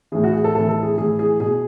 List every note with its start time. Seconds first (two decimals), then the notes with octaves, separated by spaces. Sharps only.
0.12 A2 E3 G#4
0.24 F#4
0.33 G#4
0.44 A4
0.55 A2 E3 A4
0.69 A4
0.83 G#4
0.97 A2 E3 G#4
1.19 G#4
1.40 B2 G#4